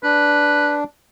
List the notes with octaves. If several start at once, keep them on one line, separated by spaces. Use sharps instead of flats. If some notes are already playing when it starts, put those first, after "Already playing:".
D4 B4